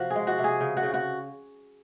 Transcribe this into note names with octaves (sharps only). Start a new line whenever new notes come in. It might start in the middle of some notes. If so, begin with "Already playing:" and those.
Already playing: C3 F3 F#4
G#3 G#4
F#4
C3
G#4
C#3
F#4
C#3
F#4